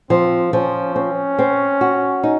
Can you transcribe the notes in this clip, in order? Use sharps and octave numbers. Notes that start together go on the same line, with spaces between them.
F3 C4
F3 C#4
C4 C#4
C4
F#4
D#4